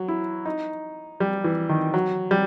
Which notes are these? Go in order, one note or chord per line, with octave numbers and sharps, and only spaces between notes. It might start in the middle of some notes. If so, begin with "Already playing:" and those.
Already playing: F#3
E4
D#4
G3
E3
D#3
F#3
G3